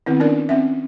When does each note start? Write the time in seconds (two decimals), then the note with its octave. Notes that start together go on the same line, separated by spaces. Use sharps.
0.06 D#3 B3 C4 E4
0.20 C#4 D4 A#4 D5
0.49 C4 C#4 E5